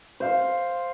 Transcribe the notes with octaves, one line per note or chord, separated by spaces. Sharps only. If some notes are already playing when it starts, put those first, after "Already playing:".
C5 F5